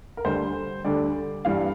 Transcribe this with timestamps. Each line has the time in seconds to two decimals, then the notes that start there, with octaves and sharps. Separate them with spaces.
0.17 A#4
0.25 D2 D3 G3 C5
0.85 D2 D3 G3 D5
1.45 G2 E3 G3 F5